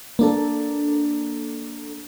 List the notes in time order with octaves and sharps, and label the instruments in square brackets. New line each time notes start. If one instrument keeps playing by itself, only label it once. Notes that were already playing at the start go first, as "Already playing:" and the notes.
[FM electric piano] A#3 D4 A4